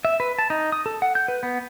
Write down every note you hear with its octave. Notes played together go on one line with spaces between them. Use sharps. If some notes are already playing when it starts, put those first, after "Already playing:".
E5
B4
A5
D#4
D#6
A4
F#5
G6
B4
B3